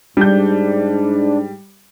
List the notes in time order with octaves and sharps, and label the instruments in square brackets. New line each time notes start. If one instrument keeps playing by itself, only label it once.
[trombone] G#2 [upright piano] G3 G6 [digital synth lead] D4